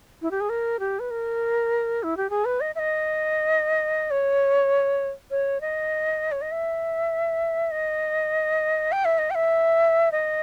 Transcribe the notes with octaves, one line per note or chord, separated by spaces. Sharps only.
E4
G4
G#4
A#4
G4
B4
A#4
E4
G4
G#4
B4
D#5
E5
D#5
C#5
C#5
D#5
C#5
D#5
E5
D#5
G5
E5
D#5
G5
E5
D#5